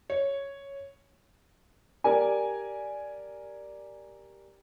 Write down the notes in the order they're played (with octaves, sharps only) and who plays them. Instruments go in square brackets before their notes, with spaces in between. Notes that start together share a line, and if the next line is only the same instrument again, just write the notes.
[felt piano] C#5
[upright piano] G4 A#4 D5 G#5